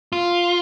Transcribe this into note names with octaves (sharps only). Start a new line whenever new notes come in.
F4